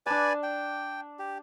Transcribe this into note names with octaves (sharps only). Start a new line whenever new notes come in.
D4 B4 D5 G#5 A5
G5
G4